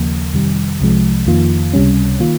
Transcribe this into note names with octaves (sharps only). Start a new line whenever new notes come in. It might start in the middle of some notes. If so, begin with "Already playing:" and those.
Already playing: D#2 C#3 F3 A#3
F2 C3 D#3 G3
C2 C3 F3 G#3
F2 D#3 A#3 F4
C#2 C3 G3 C#4
D#3 A#3 F4